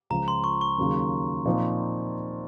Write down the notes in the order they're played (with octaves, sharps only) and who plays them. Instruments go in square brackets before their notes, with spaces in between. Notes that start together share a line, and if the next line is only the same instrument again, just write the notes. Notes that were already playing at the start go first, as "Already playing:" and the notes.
[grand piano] C#2 C#3 F3 [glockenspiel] A#5
[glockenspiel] C6
C#6
C#6
[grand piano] D#2 C#3 F#3 A#3
A#2 F3 C4 D#4